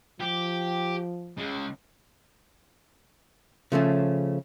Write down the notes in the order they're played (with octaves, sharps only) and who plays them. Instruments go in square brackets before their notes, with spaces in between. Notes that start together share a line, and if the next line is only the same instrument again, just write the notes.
[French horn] F3 [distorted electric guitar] G4
[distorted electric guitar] C#3 G#3
[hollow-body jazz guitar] C#3 F3 A3 C#4